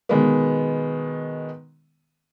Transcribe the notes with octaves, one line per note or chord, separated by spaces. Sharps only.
B2 D#3 G#3 B3